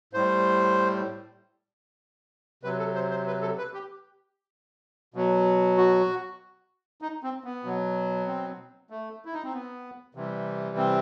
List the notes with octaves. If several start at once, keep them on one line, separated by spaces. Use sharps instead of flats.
A2 G3 C5
C3 F#3 B4
A4
C5
C5
B4
A4
B4
G4
B2 F#3
F#4
D#4
C4
B3
B2 F#3
C4
A3
E4
D#4
C4
B3
C3 E3 G3
C4